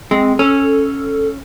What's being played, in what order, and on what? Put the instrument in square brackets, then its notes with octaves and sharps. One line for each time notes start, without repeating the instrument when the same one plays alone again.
[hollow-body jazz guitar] G#3 [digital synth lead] C4
[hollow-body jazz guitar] C#4 [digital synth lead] A4